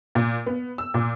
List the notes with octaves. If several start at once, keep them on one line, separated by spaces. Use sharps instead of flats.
A#2
B3
E6
A#2